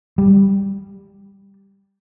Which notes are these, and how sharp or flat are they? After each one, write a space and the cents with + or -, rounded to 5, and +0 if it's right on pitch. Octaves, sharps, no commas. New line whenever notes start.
G3 +5